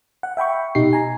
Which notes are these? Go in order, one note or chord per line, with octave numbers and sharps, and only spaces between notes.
F#5
E5 G5 B5 C#6
B2 D#4 G4 C7
G#5 A#5